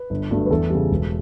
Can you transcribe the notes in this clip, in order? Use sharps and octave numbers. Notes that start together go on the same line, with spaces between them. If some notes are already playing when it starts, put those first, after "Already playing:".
Already playing: B4
G1
G2 F#3 A3
B4
E2 A4
C#3 G3
E1